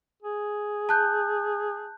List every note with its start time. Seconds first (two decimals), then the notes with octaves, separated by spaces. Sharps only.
0.22 G#4
0.89 A5 F#6 G6